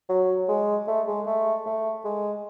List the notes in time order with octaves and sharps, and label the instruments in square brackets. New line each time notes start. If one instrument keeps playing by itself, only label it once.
[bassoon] F#3
G#3
A3
G#3
A3
A3
G#3